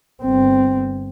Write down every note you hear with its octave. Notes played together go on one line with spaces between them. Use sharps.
G1 C4